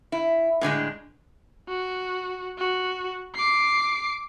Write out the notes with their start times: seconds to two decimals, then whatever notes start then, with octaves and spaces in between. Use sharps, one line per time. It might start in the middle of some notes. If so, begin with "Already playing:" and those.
0.12 E4
0.61 A2 D3 F#3 G#3
1.69 F#4
2.58 F#4
3.36 D6 C7